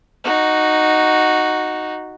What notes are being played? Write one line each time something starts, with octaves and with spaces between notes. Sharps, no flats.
D#4 F#4